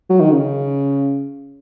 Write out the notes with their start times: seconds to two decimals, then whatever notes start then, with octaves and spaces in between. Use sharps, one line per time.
0.10 F#3
0.21 D#3
0.32 C#3